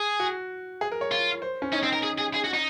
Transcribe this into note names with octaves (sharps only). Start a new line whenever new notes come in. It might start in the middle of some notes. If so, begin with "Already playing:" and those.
Already playing: G#4
F#4
G#4
A#4
C#5
F4
C5
C#4
C#4 D#4
C4
A#4
G#4
G#4
G#4
F#4
D#4